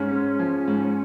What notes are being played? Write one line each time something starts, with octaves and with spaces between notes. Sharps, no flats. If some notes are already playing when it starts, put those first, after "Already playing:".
Already playing: G#2 C#4
G#3
F3
G#2